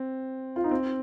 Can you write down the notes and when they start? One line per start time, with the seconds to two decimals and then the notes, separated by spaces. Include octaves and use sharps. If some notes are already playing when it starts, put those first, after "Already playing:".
Already playing: C4
0.56 F4
0.64 D#4
0.71 C4